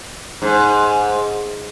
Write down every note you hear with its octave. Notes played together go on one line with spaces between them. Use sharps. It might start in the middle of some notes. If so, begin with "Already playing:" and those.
G#2